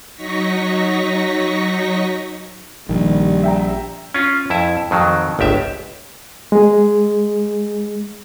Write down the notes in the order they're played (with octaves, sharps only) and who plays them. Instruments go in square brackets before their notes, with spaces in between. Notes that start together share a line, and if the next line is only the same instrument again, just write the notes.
[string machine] F#3 D#4 C#6 A#6 B6
[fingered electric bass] A#1 [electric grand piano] D#3 [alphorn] G3
[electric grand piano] E5 G5 A#5
[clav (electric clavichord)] C#4 F4
F2 E4 E5
F2 D#3 F#3
G1 C#2 G4 E5
[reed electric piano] G#3 G#4